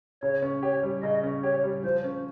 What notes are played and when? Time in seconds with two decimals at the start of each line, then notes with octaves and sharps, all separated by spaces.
0.22 C#3 C#5
0.42 C#4
0.63 G4 C#5
0.83 G3
1.03 C#3 D#5
1.23 C#4
1.44 G4 C#5
1.64 G3
1.84 F3 C5
2.04 C#4